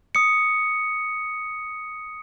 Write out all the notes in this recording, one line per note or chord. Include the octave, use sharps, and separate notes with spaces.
D#6 C#7